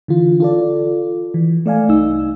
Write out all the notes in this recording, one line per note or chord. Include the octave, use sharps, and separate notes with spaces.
D3 E3 F4
F4 A4 D5
E3
A3 D5 F5 G#5
C2 D#4 E6